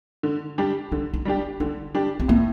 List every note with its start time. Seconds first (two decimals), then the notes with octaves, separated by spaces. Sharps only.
0.23 D3
0.58 G3 D4 G4
0.92 D3 D#4
1.14 D#4
1.25 G3 D4 G4
1.60 D3 D4
1.94 G3 D4 G4
2.20 C4
2.28 A2 A#3